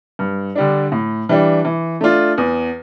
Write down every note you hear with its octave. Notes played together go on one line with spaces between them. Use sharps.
G2
D3 G3 D4
A2
E3 G3 D4
E3
A3 D4 F4
E2